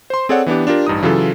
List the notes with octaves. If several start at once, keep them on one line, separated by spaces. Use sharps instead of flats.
C5 C6
C4 G#4 A4 C#5 D5 F#5
E3 B3 D4 G4
D4 F4 G4 A#4
A1 G2 D#4 D#6
C#3 E3 F#3 F4 A4